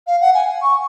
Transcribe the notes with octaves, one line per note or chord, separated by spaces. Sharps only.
F5
F#5
G#5
C#6